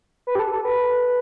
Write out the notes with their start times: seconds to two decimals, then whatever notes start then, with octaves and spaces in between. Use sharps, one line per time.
0.27 B4
0.35 G4
0.39 A4
0.52 A4
0.65 B4